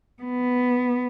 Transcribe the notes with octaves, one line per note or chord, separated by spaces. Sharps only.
B3